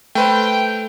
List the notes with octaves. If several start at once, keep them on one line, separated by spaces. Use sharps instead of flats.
A3 B4 C5 G5